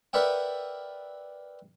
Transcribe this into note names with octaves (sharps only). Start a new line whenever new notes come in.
A#4 B4 D5 E5 F#5 G5